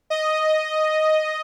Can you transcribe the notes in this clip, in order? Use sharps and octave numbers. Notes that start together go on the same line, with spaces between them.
D#5